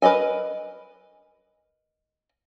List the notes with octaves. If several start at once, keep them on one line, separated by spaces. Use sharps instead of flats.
A#4 B4 D5 D#5 G#5